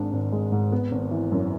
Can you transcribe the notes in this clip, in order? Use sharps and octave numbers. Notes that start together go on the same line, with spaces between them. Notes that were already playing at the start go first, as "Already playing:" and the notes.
Already playing: G#1 G#2 G#3 D4
G#1
G#3
G#2
B3
G#1
E3
F#2